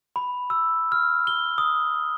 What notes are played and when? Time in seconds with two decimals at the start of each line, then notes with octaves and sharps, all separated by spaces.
0.16 B5
0.50 E6
0.92 F6
1.27 G7
1.58 D#6